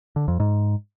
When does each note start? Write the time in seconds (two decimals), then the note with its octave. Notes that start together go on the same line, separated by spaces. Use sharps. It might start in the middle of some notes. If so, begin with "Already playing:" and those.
0.16 D3
0.28 F2
0.40 G#2